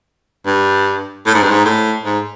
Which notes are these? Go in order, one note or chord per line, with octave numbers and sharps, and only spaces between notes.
G2
A2
G#2
G2
G#2
A2
G#2